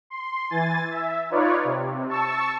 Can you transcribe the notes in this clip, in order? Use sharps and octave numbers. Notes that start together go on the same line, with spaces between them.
C6
E3 G#5 A6
E5
D#4 F4 B4 C#5 D5
C3
A5 C#6 E6